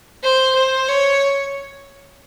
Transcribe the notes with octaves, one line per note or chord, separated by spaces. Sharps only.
C5
C5
C#5